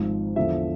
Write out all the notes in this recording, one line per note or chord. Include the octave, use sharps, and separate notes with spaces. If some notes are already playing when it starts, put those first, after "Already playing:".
Already playing: G#1 G#2 F3
E2 D3 F3 E5